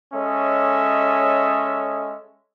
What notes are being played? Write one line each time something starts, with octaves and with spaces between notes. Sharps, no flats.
G#3 C#4 A4 C#5 D#5 E5